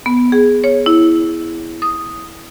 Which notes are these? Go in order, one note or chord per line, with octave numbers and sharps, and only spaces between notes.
B3
G#4
C#5
E4
D#6